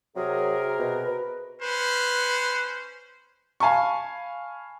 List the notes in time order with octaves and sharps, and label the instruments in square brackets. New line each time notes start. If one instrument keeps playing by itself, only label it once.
[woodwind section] C3 G#4 A#4 [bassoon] F#3
[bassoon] B2
B4
[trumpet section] C#4 C5 [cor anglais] B4
[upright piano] F5 G#5 A5 B5 C#6